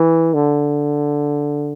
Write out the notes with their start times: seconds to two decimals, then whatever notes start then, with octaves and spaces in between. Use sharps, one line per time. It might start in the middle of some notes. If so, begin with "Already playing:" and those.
Already playing: E3
0.34 D3